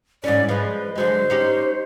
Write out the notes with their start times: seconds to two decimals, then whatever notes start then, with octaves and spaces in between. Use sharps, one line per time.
0.24 G#2 E3 C#4 D5
0.49 F3 G#3 B4
0.95 D3 F#3 G#3 C5
1.30 C#4 D#4 G4